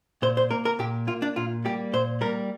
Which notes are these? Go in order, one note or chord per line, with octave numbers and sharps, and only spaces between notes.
A#2 C5
C5
A#3 A#4
A#4
A#2 G4
A#3 F4
D4
A#2 F4
G3 A#3 G4
A#2 C5
G3 A#3 A#4